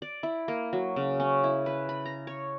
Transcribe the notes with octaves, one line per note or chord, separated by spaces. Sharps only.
D5
E4
A#3
F#3
C#3
C#4
E4
B4
B5
A#5
C#5